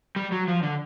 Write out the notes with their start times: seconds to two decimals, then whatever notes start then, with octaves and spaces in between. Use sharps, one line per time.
0.16 G3
0.32 F#3
0.48 F3
0.63 D3